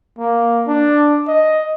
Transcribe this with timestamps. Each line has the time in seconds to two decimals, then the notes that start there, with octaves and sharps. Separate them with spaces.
0.19 A#3
0.67 D4
1.28 D#5